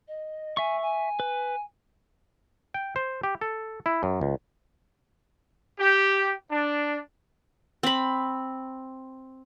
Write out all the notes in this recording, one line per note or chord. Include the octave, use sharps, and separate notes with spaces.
D#5
E5 G#5 C#6
G#5
B4
G5
C5
G4
A4
E4
F#2
C#2
G4
D4
C4 B5